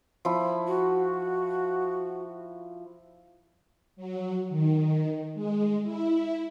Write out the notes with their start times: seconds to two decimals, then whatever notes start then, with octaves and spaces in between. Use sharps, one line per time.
0.25 F3 E4
0.67 F#4
3.97 F#3
4.49 D#3
5.35 G#3
5.83 E4